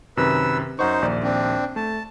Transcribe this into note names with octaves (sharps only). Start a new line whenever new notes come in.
F#2 C3 D#3 B4 E6
F#2 D#4 C5 F#5 C#6
A#1 D#2 D5
C4 D4
A3 A5